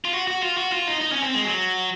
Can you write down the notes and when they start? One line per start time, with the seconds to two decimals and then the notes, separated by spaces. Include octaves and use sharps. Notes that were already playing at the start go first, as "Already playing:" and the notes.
0.05 F4
0.14 F#4
0.28 F#4
0.43 F4
0.57 F#4
0.72 F4
0.87 D#4
1.01 D#4
1.12 C#4
1.23 C4
1.34 G#3
1.44 F#3